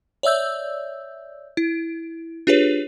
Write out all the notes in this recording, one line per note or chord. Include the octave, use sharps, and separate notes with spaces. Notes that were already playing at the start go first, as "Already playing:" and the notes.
C#5 D5 E5 E6 G6
E4
D4 F4 G4 G#4 B4 C#5